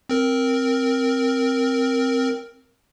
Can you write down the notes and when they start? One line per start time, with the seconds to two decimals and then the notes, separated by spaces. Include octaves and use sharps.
0.09 C4 A#4